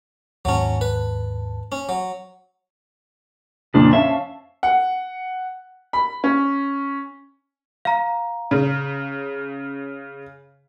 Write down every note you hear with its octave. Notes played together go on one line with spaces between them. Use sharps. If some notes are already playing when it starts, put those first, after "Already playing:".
D#2 G#2 F#3 C#4 A5
B4
C#4
F#3
F2 A#2 C#3 D4
C#4 E5 F5 A5
F#5
B5
C#4
F5 A#5
C#3